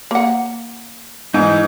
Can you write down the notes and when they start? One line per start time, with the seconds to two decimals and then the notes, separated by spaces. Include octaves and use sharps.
0.11 A#3 F#5
1.34 G#2 E3 D#4